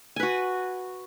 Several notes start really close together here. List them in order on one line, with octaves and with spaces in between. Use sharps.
G#5 B4 F#4